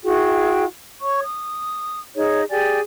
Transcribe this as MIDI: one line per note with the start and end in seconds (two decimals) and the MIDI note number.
0.03 0.65 64
0.03 0.65 66
0.03 0.65 68
0.03 0.65 79
1.01 1.22 73
1.01 1.22 85
1.24 2.00 87
2.15 2.43 63
2.15 2.43 68
2.15 2.43 73
2.50 2.80 67
2.50 2.80 68
2.50 2.80 74
2.50 2.80 80